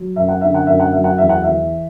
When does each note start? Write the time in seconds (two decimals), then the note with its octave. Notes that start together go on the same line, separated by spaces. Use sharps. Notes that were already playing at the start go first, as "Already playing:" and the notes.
Already playing: F#3
0.16 F#2 E5
0.29 F#5
0.41 D3 E5
0.54 F#5
0.67 F#2 E5
0.80 F#5
0.93 F#3 E5
1.04 F#5
1.18 E2 E5
1.29 F#5
1.43 E3 E5